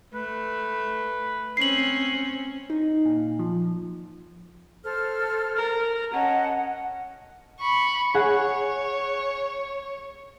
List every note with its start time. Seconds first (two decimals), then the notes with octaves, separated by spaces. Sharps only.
0.14 A3 B4
1.57 C4 C#4 C7 F#7
2.70 D#4
3.05 A#2
3.39 F3
4.84 A4 C5 F6
5.56 A#4
6.14 C#4 D#5 F#5 A5
7.60 B5 C#6
8.14 G#4 C#5 F#5